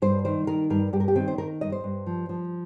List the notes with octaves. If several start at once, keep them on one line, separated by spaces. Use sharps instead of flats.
G2 C5
D#3 C5
D#3 A#4
G2 A#4
G2 G4
A#4
G4
D#3 C4
C5
D#3 A#4
G2 D#5
C5
G2
F3
F3